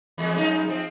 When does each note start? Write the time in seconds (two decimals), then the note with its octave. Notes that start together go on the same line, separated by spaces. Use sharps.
0.18 E2 G#3
0.36 F2 G#3 D#4
0.68 F3 C4